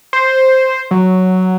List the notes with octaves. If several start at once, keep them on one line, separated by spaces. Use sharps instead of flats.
C5
F#3